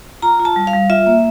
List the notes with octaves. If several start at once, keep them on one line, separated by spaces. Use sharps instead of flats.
F4 A#5
F4
A5
G3
F5
G3
F4 E5
A#3